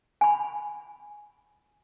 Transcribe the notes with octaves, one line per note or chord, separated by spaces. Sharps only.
G#5 B5